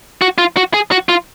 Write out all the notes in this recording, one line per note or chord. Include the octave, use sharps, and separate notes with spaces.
F#4
F4
F#4
G#4
F#4
F4